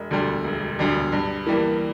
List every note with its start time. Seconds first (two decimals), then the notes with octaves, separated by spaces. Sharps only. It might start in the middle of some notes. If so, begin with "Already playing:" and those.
Already playing: E1
0.11 D2 D3 G3
0.44 E1
0.79 D2 D3 G3
1.12 G2
1.46 E3 G3 A#3